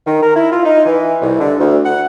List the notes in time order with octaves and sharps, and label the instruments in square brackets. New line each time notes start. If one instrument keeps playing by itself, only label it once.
[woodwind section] D#3
A#4
E4
F4
D#4
E3
C2
D3
D2
F#5